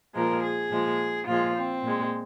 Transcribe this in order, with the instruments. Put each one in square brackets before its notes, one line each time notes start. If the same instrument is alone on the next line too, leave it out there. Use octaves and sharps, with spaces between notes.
[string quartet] A#2 F3 G#3 A#4
G#4
A#2 F3 G#3
A#2 F3 G#3 F4
C4
A#2 G#3